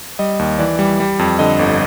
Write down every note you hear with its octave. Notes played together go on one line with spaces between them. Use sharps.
G3 D#5
D#2
E3 D5
G3
G3
F2
D3 D#5
G1